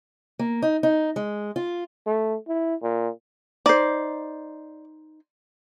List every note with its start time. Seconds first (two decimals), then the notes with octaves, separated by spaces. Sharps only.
0.39 A#3
0.62 D#4
0.83 D#4
1.16 G#3
1.56 F4
2.07 A3
2.48 E4
2.82 A#2
3.66 D#4 C5 D5